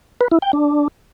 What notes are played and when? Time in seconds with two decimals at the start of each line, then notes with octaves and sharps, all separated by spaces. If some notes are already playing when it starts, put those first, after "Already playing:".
0.21 B4
0.31 E4
0.42 G5
0.53 D4